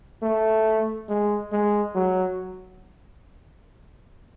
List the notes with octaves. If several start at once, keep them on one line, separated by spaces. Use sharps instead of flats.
A3
G#3
G#3
F#3